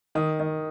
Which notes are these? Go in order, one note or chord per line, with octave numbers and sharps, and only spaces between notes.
D#3 D#6
D#3